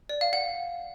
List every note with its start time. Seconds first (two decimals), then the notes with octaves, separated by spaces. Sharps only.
0.09 D5
0.21 F5
0.33 F#5